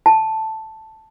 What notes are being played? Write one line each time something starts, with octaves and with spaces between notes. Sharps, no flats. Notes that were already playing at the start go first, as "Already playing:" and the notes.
A5